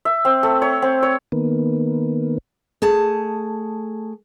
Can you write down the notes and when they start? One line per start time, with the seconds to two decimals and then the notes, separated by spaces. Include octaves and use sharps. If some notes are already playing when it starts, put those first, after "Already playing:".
0.05 E5
0.25 C4
0.43 A3
0.62 C#5
0.82 C4
1.02 C#5
1.32 D#3 A#3 B3
2.82 A3 G#4 A5